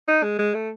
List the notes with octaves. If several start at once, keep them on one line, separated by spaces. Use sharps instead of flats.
D#4
G#3
G#3
A3